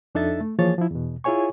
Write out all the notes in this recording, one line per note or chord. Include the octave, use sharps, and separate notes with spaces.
F2 D4 D#4 A4 E5 A6
A3
E3 F3 A#3 G#4 C#5 A6
F3 E4
E2 B2
E4 F4 G#4 C#5 G#5 C#6